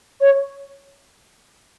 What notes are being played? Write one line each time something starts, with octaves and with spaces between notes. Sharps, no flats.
C#5